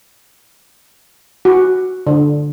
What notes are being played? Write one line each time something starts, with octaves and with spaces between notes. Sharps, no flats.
F#4
D3